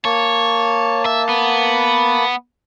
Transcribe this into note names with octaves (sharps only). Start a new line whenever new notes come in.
A#3 C#5 A5
E5
B3